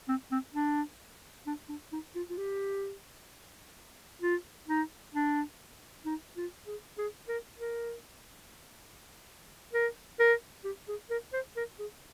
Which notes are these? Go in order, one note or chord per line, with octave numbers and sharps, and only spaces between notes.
C4
C4
D4
D4
D4
D#4
F4
F4
G4
F4
D#4
D4
D#4
F4
G#4
G#4
A#4
A#4
A#4
A#4
G4
G#4
A#4
C5
A#4
G#4